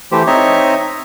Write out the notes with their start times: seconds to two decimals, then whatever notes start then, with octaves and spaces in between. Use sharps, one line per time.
0.12 E3 A3 G4 C5
0.27 C4 D#4 C#5 D#5 E5